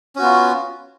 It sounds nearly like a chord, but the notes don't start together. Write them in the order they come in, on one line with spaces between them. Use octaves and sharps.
C#4 F#4 B3 F4